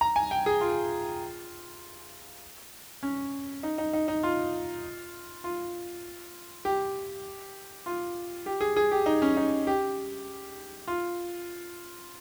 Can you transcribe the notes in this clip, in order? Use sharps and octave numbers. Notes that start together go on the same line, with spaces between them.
A#5
G#5
G5
G#4
F4
C#4
D#4
D#4
D#4
D#4
F4
F4
G4
F4
G4
G#4
G#4
G4
D#4
C#4
D#4
G4
F4